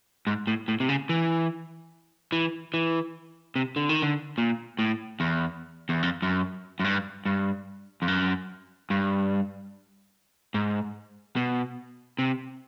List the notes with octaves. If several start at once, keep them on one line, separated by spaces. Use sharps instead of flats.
G#2
A2
A2
C3
C#3
E3
E3
E3
C3
D3
D#3
D3
A#2
A2
E2
E2
F2
F#2
F#2
G2
G2
F2
F#2
G2
G#2
B2
C3